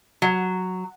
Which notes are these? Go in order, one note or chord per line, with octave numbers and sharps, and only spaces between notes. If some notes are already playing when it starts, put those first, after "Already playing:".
F#3